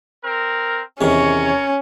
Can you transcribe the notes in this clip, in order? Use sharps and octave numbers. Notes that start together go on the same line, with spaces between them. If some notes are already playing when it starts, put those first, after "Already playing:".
C4 A#4
E2 C3 D#3 C#4 A#4 C#5